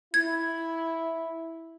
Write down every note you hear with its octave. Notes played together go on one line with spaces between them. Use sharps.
E4 G#6